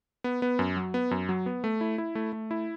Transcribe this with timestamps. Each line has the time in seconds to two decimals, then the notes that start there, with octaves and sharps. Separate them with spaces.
0.24 B3
0.42 B3
0.59 F#2
0.76 F#3
0.94 B3
1.11 F#2
1.29 F#3
1.46 B3
1.64 A3
1.81 E4
1.98 E4
2.15 A3
2.33 A3
2.51 E4